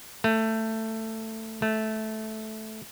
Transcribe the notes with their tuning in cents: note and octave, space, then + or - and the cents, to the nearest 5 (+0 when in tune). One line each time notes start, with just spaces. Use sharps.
A3 +15
A3 -10